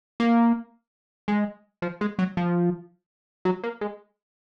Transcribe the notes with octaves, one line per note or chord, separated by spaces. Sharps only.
A#3
G#3
F3
G#3
F#3
F3
F#3
A#3
G#3